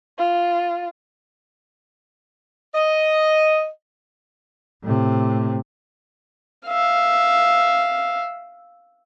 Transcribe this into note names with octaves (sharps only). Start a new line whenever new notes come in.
F4
D#5
A2 C3
E5 F5